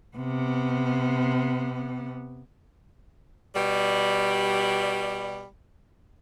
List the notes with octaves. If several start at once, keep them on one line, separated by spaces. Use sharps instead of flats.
C3 B3
B2 G3